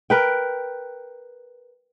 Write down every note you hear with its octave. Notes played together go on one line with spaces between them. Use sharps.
A#4 B4 G5